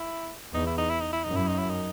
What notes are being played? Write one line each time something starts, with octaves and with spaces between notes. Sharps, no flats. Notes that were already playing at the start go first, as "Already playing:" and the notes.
Already playing: E4
E2 D#4
E4
D#4
E4
D#4
E4
F#2 D#4
E4
D#4
E4
D#4